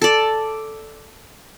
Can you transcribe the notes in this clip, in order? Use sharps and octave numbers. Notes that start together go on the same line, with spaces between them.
A4 D5